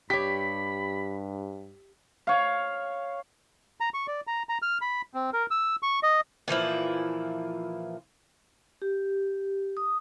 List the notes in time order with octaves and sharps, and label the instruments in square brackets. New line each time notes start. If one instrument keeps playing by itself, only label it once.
[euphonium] G2 [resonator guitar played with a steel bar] G4 C#5 [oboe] B5 [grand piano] B6
[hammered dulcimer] C#5 F5
[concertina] A#5
C#6
D5
A#5
A#5
F6
B5
C4
A#4
E6
C#6
D#5
[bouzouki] A#2 E3 F3 E4
[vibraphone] G4
D#6